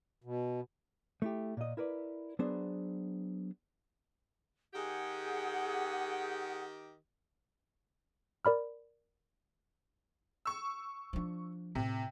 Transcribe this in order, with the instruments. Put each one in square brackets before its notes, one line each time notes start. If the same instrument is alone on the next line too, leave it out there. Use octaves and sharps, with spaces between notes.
[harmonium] B2
[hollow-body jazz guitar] A3 E4 G4
A#2 D#5
E4 A#4 B4 D5
F#3 B3 D4 G#4 C5
[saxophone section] D#3 G4 [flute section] G#4 F#5
[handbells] A#4 D5 B5 F6
[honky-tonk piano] C#6 E6
[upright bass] F3 D4
[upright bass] A2 [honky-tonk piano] C3